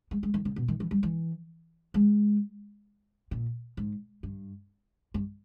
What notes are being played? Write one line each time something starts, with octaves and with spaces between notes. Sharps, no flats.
G#3
G#3
D#3
C#3
B2
D#3
E3
G3
E3
G#3
A#2
G#2
G2
G2